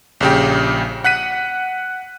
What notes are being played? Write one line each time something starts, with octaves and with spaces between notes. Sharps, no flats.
A#1 C#3 G4
F#5 F#6 B6 D#7